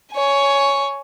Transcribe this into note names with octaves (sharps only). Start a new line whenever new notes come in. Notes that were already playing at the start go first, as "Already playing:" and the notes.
C#5 G#5